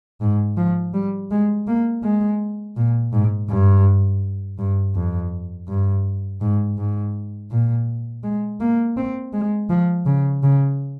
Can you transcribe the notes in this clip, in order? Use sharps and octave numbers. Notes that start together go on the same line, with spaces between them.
G#2
F3
G3
G#3
A#3
G#3
A#2
G#2
G2
G2
F2
G2
G#2
G#2
A#2
G#3
A#3
C4
G#3
F3
C#3
C#3